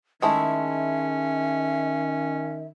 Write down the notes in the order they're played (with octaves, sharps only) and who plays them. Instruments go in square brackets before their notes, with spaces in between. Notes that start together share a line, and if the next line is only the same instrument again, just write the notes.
[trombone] D#3 [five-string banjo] G#3 A3 E4 [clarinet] C#4 [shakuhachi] E5